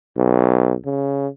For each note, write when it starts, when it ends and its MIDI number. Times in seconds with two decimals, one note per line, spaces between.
0.17 0.73 35
0.85 1.27 49